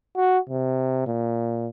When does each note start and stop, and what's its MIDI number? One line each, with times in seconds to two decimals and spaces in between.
0.17 0.38 66
0.49 1.06 48
1.07 1.67 46